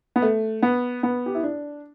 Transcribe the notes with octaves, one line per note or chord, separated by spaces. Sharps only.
B3
A3
B3
B3
G4
E4
D4